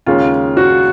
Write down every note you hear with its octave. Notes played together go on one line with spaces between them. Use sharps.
D#2 C#3 G#3 C#4 F4
F#4